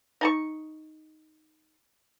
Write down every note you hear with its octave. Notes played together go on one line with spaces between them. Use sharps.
D#4 A5 C#6